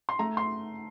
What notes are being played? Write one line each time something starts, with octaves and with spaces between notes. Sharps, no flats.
C6
A3 A#5
C6